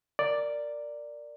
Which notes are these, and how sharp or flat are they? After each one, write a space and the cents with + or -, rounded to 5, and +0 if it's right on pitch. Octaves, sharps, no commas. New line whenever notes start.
A#4 -5 D5 +0